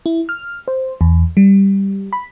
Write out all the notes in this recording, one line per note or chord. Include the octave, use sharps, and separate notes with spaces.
E4
F6
C5
E2
G3
B5